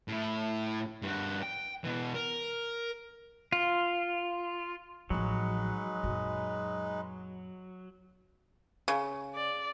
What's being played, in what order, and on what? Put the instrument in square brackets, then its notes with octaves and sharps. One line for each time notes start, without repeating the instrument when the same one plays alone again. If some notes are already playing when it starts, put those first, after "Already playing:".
[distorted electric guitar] A2 E4
G2 F#4
G5
B2 E3
A#4
[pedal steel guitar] F4
[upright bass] A1 F3 [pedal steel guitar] F#3 [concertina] G#3 D#4 B4
[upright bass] F#2 A#2
[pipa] C#3
[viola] D5